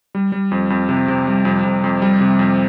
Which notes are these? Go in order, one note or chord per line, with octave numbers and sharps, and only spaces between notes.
G3
G3
F2
F2
C3
C3
G3
F2
F2
F2
G3
C3
F2